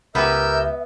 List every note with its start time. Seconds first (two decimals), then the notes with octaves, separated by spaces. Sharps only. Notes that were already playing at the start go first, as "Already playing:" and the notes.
0.15 C#2 B3 G4 A#4 E5 E6 G6